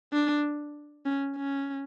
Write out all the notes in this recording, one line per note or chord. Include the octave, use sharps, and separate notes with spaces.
D4
C#4
C#4